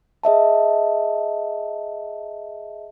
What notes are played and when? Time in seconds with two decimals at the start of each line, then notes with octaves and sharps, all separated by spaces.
0.23 G#4 D#5 E5 A5